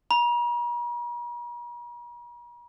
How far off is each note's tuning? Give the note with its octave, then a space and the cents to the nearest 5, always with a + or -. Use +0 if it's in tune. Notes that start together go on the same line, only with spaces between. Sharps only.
A#5 +45